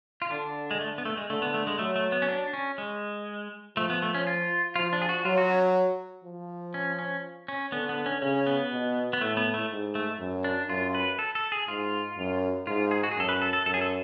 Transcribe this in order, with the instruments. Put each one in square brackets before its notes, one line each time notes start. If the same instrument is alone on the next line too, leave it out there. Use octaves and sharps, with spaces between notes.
[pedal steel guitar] F4
[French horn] D3 [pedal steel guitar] D4
[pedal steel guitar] G#3
A3
B3
A3
G#3
[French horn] D3 [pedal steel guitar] A3
[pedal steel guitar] B3
A3
G#3
[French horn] F#3 [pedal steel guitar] A3
[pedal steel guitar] A3
B3
C#4
D4
C#4
G#3
[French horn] F3 [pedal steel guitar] A3
[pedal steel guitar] B3
A3
C#4
F4
[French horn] F3 [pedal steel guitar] F4
[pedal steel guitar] D4
G#4
F#4
[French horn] F#3 [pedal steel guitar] F4
[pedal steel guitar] F#4
C#4
[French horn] F3
[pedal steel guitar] C#4
C#4
C#4
[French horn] D3 [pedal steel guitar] B3
[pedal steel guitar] B3
C#4
[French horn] C#3 [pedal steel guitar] C#4
[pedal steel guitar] B3
[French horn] B2
[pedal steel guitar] B3
[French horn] A2 [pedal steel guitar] A3
[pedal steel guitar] B3
A3
[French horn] G#2
[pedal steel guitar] A3
[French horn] F#2
[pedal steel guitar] D4
[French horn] F#2 [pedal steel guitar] F4
[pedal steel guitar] B4
A4
A4
G#4
[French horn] G#2 [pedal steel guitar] F4
[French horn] F#2
[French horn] G#2 [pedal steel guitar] F4
[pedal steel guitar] G#4
F#4
G#4
[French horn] F#2 [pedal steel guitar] A4
[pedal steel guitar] B4
A4
A4
[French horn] F#2 [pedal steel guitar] A4
[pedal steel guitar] G#4
A4